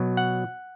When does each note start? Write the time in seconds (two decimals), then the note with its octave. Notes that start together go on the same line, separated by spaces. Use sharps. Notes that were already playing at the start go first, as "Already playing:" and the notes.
Already playing: B2 F#3
0.17 F#5